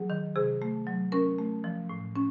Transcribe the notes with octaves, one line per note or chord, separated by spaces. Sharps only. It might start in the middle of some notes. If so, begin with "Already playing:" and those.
Already playing: F#3 G#4
D#3
C3 G#4
A3
F#3
C#4 A#4
A3
F3
A2
C#4